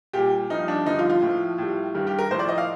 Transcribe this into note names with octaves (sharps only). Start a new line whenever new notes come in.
A#2 G3 G4
G2 F3 D#4
D4
G2 D3 F3 D#4
F4
F4
A2
F3
A2 G3
G2 D#3 G3
G4
A#4
A2 F3 C5
D5
D#5
F5